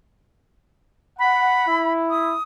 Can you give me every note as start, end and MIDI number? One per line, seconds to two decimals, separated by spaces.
1.19 1.64 78
1.19 1.92 83
1.66 2.35 64
2.10 2.43 87